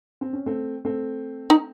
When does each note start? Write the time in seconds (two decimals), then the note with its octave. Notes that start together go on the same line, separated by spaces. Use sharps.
0.21 C4
0.33 C#4
0.46 A3 C4
0.85 A3 C4
1.50 D#4